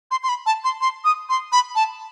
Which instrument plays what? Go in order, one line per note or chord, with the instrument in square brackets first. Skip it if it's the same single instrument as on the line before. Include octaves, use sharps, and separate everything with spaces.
[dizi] C6
C6
B5
A5
C6
C6
D#6
C6
B5
A5